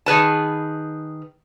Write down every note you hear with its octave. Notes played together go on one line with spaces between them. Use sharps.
D#3 G#4 B4 A5